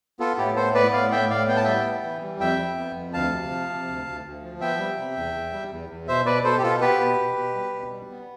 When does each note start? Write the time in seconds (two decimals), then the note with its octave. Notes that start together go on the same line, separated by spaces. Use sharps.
0.20 B3 F4 A4
0.38 A2 E4 G4
0.56 B3 A4 C5
0.74 B3 B4 D5
0.93 A2 D5 F5
1.11 A2 E5 G5
1.30 A2 D5 F5
1.48 B3 G5
1.57 A5
1.64 G3 E5 G5
1.85 B3
2.04 E3
2.22 G3
2.40 F2 E5 G5
2.59 F2
2.77 B3
2.96 F2
3.13 D2 F5 A5
3.32 C3
3.51 F3
3.69 C3
3.87 D2
4.06 D2
4.24 D2
4.42 F3
4.61 B3 E5 G5
4.79 G3
4.98 C3
5.16 E2
5.34 E2
5.53 G3
5.71 E2
5.89 E2
6.08 B2 C5 E5
6.26 B2 B4 D5
6.44 B2 A4 C5
6.58 G4
6.63 B2 F4 A4
6.81 B3 G4 B4
7.00 B2
7.18 B2
7.36 B2
7.55 G3
7.74 B2
7.92 G3
8.11 B3